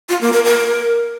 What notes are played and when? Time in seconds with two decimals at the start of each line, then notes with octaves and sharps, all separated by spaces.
0.09 F4
0.21 A#3
0.33 A#4
0.45 A#4